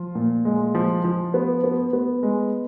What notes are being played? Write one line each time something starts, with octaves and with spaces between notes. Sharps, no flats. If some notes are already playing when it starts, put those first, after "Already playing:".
Already playing: F3 F4
A#2
G#3
F3
F3
B3
B3
B3
G#3